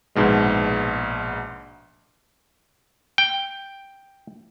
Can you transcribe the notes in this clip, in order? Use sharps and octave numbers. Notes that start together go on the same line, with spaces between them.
A#1 G#2 B2 G#3
G5